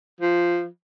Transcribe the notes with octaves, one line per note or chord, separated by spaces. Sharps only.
F3